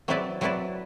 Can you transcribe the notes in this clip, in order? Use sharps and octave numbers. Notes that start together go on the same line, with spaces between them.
F#3 C4 E4 B4 D5
F#3 C4 E4 B4 D5